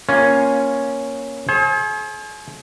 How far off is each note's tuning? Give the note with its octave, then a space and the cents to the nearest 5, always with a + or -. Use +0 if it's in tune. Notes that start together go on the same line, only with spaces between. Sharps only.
A#3 +15 C#4 +0 F4 +0
G#4 +40 C5 +45